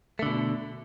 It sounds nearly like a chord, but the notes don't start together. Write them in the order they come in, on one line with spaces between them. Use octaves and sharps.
A3 D3 B2